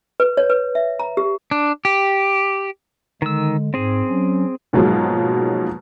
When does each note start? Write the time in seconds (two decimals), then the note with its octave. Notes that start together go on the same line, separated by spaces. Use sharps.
0.20 B4
0.37 C#5
0.50 B4
0.75 E5
0.99 A#5
1.17 G4
1.51 D4
1.85 G4
3.22 D3 D#3 G#3 E6
3.74 G#2 C4 G#4
4.09 F#3 C#4
4.73 G#2 B2 F3 F#3 G#3 A#3